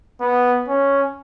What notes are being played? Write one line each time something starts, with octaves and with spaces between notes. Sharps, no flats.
B3
C#4